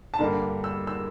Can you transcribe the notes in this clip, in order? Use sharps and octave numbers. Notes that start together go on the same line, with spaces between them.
A5
G2 D3 G3 A#3 A#5
E6
E6